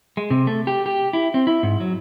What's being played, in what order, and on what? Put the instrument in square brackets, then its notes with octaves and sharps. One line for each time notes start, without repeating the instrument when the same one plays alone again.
[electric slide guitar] G#3
C3
A3
G4
G4
E4
C4
E4
G#2
F#3